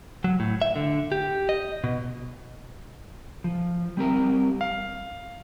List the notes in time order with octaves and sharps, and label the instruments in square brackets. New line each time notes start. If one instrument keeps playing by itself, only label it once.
[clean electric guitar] F#3
A2
E5
D3
G4
D#5
B2
[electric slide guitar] F3
G3 C4 G4 A#4
[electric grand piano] F5